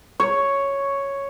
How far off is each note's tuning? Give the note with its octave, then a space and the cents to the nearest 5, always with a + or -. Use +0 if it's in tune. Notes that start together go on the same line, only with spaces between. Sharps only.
C#5 +0